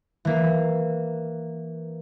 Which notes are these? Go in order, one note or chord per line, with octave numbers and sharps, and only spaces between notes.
E3 A#3